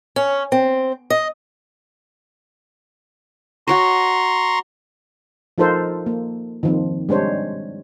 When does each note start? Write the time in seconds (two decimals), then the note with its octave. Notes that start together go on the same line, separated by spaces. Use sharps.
0.16 C#4
0.52 C4
1.10 D#5
3.68 F#4 C#5 D#5 A#5 C6 C#6
5.58 F3 D#4 F4 A4 A#4 C5
6.06 A#3
6.63 D#3 F3 C4
7.09 G3 G#3 D4 C5 C#5